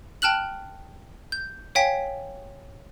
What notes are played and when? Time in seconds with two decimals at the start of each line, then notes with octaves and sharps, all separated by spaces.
0.22 G5 A5 F6 F#6 F#7
1.32 G6
1.75 C#5 F5 G5 G#5 B6